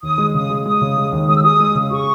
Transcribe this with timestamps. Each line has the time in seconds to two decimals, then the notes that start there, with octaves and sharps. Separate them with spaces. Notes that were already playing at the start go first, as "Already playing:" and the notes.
0.03 D#2 D#6
0.18 G#3
0.34 C#3 D#6
0.49 G#3
0.66 G#3 D#6
0.82 C#3
0.97 G#3
1.12 D#2
1.28 G#3 D#6
1.36 E6
1.43 G#4 D#6
1.60 G#3
1.75 C#3
1.91 G#4 C#6